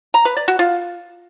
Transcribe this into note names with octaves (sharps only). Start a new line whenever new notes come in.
A#5
B4
D5
F#4
F4